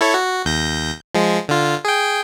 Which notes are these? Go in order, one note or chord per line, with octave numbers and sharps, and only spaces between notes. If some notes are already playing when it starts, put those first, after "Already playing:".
E4 A4 C#5
F#4
D#2 G6 A#6
F3 G#3
D3 F4
G#4 G5